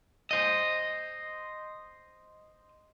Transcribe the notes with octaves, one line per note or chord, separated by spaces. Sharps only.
C5 D#5